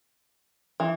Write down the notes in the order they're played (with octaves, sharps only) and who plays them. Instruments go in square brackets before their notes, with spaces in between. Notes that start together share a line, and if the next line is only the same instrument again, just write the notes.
[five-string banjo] E3